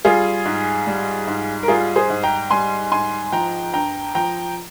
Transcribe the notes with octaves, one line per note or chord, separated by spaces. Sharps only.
G3 F4 G#4
G#2
G3
G#2
A#4
G3 F4 G#4
G#4 C5
G#2
G5 A#5
G3 G#5 C6
G#2 G#5 C6
F3 G5 A#5
G2 G5 A#5
F3 G5 A#5